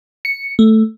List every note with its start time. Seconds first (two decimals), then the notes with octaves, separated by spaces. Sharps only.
0.25 C#7
0.59 A3